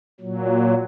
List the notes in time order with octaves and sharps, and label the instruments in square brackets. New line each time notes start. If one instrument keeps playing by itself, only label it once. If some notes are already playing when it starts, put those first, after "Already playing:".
[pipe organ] A#2 F#3